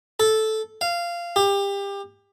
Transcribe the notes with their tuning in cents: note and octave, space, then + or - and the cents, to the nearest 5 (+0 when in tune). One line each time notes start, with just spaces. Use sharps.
A4 -10
F5 -15
G4 +25